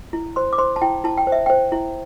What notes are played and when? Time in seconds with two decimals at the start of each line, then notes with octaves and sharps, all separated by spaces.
0.13 E4
0.36 C5 C6
0.53 D6
0.58 C5 C6
0.76 A5
0.82 E4 G5
1.04 E4 A5
1.18 G5
1.27 C5
1.32 E5
1.46 C5 G5
1.72 E4